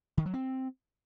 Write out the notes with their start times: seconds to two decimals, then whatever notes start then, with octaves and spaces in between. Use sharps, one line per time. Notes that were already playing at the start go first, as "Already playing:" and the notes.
0.17 D#3
0.26 F#3
0.34 C4